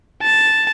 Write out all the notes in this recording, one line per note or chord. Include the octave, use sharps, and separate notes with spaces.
A5